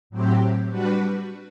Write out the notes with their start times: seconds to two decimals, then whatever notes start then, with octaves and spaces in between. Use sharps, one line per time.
0.10 A2 F#3 C4 G4
0.69 G3 D4 F#4 B4